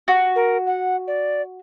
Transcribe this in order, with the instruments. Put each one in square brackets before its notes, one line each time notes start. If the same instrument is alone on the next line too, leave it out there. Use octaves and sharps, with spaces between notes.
[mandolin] F#4
[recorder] A#4
F#5
D5